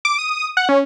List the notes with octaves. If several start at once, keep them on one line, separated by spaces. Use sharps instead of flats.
D6
D#6
F#5
C#4